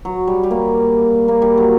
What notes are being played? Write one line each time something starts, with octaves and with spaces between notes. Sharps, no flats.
F#3
G3
G3
A#3
A#3
G3
F#3